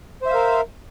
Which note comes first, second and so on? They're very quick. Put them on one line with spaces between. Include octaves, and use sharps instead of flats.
C5 E5 F5 A#4